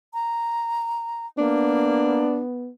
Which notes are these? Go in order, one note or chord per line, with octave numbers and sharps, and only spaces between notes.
A#5
A#3 B3 D4